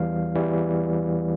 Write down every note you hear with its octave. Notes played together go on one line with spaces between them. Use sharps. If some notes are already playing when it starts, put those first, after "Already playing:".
Already playing: E2 E3 G3 F5
E2 E3 G3